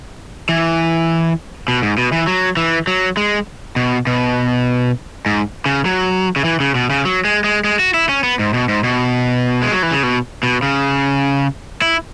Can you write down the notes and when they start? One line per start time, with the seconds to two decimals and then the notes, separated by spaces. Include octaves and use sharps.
0.49 E3
1.68 B2
1.83 G#2
1.98 B2
2.12 E3
2.27 F#3
2.57 E3
2.87 F#3
3.17 G#3
3.76 B2
4.07 B2
5.26 G#2
5.66 C#3
5.85 F#3
6.36 C#3
6.45 E3
6.60 C#3
6.75 B2
6.90 C#3
7.05 F#3
7.25 G#3
7.44 G#3
7.64 G#3
7.79 F#4
7.94 E4
8.09 C#4
8.24 B3
8.39 G#2
8.54 B2
8.69 G#2
8.84 B2
9.62 G#3
9.72 F#3
9.83 E3
9.92 C#3
10.03 B2
10.43 B2
10.63 C#3
11.82 E4